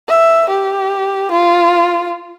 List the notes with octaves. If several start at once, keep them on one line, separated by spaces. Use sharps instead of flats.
E5
G4
F4